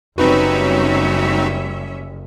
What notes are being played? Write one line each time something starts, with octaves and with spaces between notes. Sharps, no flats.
F#1 G3 C4 C#4 D#4 F#4 B4 E5